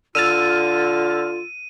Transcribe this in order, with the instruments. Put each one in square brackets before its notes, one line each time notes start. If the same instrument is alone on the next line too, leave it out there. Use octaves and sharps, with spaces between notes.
[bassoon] D3 [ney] F4 [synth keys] E6 F6 A6 [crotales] D#7